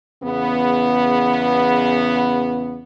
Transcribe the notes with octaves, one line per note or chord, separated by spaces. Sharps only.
E2 C#3 B3